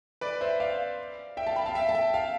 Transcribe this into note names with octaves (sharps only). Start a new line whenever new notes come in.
B4 D5
C5 E5
D5 F5
E5 G5
F5 A5
G5 B5
F5 A5
E5 G5
A5
E5 G5
F5 A5